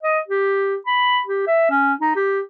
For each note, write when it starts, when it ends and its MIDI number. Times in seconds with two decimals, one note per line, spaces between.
0.03 0.20 75
0.28 0.76 67
0.87 1.20 83
1.27 1.43 67
1.47 1.70 76
1.71 1.93 61
2.01 2.12 63
2.16 2.41 67